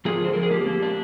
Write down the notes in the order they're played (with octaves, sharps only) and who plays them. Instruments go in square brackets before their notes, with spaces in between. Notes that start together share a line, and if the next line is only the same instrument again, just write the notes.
[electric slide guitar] F3 F4 G#4
D3 C5
F3 A#4
G#4
A#3 G4
A#3
D4